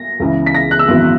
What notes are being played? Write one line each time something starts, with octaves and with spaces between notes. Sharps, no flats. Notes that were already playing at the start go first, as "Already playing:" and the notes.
Already playing: A#6
C#2 C#3 E3
B6
A#6
F#6
E6
G#1 F#2 E3 B3